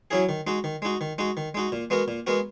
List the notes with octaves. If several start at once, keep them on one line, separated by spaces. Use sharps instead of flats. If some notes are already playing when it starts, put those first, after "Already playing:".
F#3 C#4 E4 G#4
D#3
G#3 D#4 F#4
D#3
G#3 D#4 F#4
D#3
G#3 D#4 F#4
D#3
G#3 D#4 F#4
A#2
G#3 B3 F#4 A#4
A#2
G#3 B3 F#4 A#4